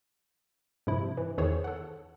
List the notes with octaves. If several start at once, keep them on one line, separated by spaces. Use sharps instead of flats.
G2 C3 F3 E4
E3
E2 D#3 E3 G#4 C5 C#5
A4 F#5